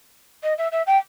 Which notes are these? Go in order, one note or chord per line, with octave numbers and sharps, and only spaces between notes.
D#5
E5
E5
G5